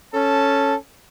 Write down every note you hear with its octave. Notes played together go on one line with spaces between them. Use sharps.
C#4 A4 A5